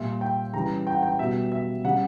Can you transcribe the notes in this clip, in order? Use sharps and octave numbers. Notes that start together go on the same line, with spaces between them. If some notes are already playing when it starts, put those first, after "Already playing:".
Already playing: A#2 G3 E5
G5
C#3 E3 G3 A#5
G5
F#5
G5
B2 G3 E5
E5
C#3 G3 F#5